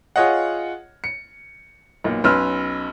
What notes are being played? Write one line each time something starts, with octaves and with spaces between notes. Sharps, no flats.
F4 G#4 C#5 D#5 F#5
C#7
B1 A#2
B1 C#4 B4 C6 E6 F6